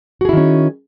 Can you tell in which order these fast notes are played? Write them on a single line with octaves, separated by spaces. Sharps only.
F#4 G#4 E4 D#3 C#4